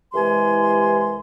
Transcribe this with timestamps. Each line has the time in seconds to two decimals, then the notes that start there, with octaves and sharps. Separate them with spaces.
0.13 C2 E3 G#3 G4 G#5 C6